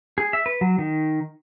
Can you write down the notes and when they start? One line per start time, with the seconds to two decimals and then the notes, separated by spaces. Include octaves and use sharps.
0.18 G#4
0.33 E5
0.46 B4
0.61 F#3
0.79 D#3